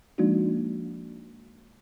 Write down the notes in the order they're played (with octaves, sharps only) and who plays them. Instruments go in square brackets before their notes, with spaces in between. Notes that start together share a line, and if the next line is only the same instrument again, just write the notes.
[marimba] F3 G#3 A#3 D4 D#4 F#4